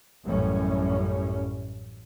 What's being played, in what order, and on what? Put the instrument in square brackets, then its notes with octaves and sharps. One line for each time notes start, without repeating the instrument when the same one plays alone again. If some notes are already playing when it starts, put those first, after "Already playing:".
[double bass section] A1 F#2 A2 G3 C#4